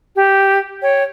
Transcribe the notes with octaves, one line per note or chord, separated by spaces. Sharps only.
G4
C#5 G5